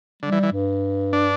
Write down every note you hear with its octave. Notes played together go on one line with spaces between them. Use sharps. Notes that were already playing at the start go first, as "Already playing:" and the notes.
D3 G3
E3
E3
G2
D4